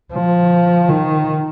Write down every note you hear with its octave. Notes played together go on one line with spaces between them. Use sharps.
F3
D#3